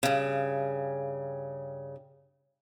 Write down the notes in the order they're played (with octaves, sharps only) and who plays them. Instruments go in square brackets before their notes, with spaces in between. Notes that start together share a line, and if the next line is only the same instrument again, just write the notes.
[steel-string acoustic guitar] G2 C#3